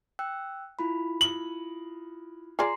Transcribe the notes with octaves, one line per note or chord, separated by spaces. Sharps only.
G5 E6 F#6
E4 F4 B5
F#7
F4 G#4 D5 A#5 C6 C7